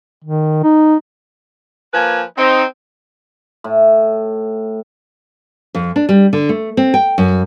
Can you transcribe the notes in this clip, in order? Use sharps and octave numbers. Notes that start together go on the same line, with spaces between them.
D#3
D#4
F3 A#3 B4 G#5
C4 D#4
A2
F2
D4
G3
D3
A3
C4
G5
F#2